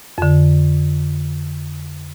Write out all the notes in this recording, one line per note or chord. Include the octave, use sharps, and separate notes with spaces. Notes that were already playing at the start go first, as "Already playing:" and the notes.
F2 D3